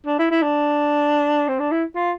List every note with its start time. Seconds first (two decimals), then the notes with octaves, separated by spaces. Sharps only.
0.06 D4
0.19 E4
0.31 E4
0.42 D4
1.48 C4
1.60 D4
1.71 E4
1.95 F4